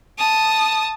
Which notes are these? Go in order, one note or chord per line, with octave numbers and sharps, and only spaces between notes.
A5 D#6